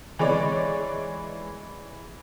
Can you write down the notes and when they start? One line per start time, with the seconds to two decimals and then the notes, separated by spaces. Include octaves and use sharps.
0.19 E3 G#3 C#5 D5